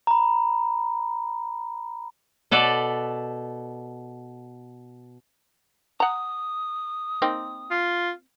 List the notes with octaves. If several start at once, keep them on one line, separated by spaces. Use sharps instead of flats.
A#5 B5
B2 A4 B4 D5
F#5 A#5 D#6
A#3 C4 D#4
F4